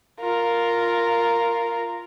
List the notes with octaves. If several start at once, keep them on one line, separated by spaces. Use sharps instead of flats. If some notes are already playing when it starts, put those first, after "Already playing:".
F4 A#4